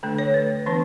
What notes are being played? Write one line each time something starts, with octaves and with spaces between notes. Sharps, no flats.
D3 A3 D4 A4
C#5
B4
E3 B3 D4 B4